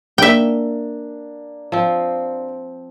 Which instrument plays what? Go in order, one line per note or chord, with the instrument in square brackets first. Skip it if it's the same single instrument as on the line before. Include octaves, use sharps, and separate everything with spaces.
[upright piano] A#3 D4 [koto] E5 G5
[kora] F3 C4